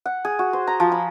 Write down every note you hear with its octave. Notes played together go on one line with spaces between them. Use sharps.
F#5
G#4
F#4
C5
A#5
F3
B5